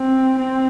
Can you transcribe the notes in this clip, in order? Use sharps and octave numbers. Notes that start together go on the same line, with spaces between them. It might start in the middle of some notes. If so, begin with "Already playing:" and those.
Already playing: C4
C4